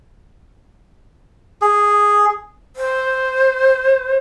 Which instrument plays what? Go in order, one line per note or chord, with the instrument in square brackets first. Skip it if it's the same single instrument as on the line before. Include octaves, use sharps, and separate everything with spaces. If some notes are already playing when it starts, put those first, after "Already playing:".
[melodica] G#4
[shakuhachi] C5